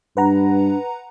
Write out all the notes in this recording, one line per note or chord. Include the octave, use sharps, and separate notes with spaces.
G2 D4 B4 F#5 A#5